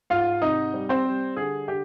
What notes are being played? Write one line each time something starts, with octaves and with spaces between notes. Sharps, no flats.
G#2 F4 F5
C3 D#4 D#5
G3
C4 C5
G3
D3 G#4
D3 G4